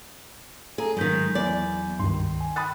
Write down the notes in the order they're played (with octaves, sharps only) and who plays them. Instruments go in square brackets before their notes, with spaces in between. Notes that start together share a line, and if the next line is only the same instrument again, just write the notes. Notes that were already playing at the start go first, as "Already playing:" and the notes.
[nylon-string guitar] G#4 [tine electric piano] A4 A#5
[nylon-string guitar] G#2 D#3 [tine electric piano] F#3 G6 B6
[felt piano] E2 [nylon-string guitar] D5
[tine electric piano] C#2 G2 [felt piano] D#3 C6
[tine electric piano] G#5
[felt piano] B5 D#6 A6 [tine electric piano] F#6